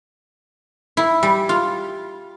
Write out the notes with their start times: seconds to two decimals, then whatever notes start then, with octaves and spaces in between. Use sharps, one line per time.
0.97 E4
1.23 G3
1.49 F4